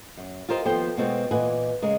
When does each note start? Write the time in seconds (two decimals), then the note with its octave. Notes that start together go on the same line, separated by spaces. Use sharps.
0.17 F#2
0.49 F4 G4 A#4 C5 D#5 F5
0.65 D#2 F3 B3 A4 C5 G5
0.97 B2 G#3 B3 C4 F4 F#4
1.31 A#2 E3 B4 D#5 F#5 G#5
1.82 C#3 G#3 A#4